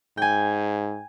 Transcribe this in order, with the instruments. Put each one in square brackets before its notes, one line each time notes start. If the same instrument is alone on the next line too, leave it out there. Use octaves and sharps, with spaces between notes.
[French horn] G#2 [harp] G5 G#5